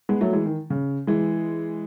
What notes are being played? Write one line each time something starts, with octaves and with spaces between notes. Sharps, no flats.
G#3 B3
F#3 A3
E3 G#3
D#3
C#3
E3 G#3